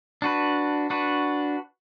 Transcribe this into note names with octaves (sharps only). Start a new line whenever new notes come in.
D4 F#4 B4
D4 F#4 B4